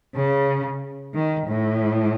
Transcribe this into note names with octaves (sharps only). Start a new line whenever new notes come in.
C#3
D#3
A2